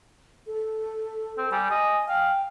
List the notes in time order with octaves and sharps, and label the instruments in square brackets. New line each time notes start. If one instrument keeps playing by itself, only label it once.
[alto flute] A4
[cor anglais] C4
[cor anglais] G3 [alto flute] G#5
[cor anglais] D#5
[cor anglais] F5 [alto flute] G5